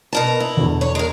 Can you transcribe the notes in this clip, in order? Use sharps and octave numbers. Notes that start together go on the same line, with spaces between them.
B2 A#4 A5
E4
E2 B2 D3
C#5
G#3 A#4